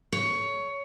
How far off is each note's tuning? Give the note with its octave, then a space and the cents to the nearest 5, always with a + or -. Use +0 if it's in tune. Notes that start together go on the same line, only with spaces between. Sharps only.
C#5 +15